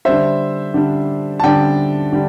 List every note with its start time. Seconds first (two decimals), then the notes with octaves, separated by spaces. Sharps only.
0.05 D3 G3 D4 C5 E5
0.74 D3 G3 D4
1.40 A5
1.43 D3 G3 D4 D5 G5
2.12 D3 G3